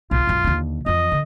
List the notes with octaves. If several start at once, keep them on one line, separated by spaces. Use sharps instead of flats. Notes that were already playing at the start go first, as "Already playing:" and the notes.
B1 F4
B1 F#2
D#2 D3
F2 E3 D#5
D3